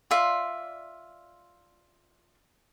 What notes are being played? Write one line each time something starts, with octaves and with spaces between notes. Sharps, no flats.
F4 D5 E5 C6